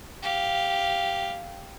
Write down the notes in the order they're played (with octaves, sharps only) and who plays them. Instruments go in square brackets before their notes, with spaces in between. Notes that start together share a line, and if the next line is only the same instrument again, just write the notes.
[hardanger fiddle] G4 F5